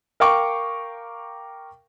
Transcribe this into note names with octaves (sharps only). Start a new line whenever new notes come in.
A#4 F5 G5 C#6 D6